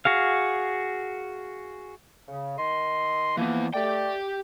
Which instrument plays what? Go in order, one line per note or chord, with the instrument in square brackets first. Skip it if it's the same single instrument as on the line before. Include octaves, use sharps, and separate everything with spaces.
[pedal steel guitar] F#4 G#4 F5
[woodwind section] C#3
D#3 D#5 C6
[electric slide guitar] E3 B3 [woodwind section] F3 A#3
[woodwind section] A3 D5 [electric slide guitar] G4 G5